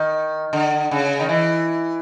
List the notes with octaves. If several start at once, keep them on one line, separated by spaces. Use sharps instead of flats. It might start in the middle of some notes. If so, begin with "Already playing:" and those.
Already playing: D#3
D3
C#3
D#3
E3